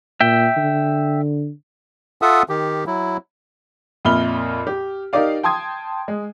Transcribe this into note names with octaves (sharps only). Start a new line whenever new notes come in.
A#2 E5 G5
D3
F4 A4 E5 F#5 D#6
D#3 G4
F#3 E4
F2 A#2 E5 B5 F6 G7
G4
D#4 G4 A#4 D5 F5
G5 A5 C6 D#6 G#6
G#3